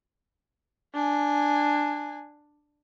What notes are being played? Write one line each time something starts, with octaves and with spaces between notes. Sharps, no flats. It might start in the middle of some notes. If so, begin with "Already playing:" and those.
D4 G#5